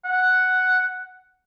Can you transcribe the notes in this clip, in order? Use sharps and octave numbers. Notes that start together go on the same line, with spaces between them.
F#5